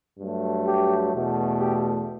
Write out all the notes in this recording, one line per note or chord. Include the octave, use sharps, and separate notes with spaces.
G2 F#3 A3
G4
E2 B2 A3
G4